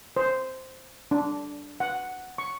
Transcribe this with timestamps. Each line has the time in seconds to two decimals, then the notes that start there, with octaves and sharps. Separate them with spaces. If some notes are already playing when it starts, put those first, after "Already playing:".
0.17 C5
1.11 D4
1.80 F#5
2.38 C#6